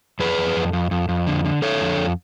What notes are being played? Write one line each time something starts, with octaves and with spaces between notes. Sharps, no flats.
F2 G#4 B4
F2
F2
F2
F2
F2
D3
D3
D3 A4 C#5
F2
F2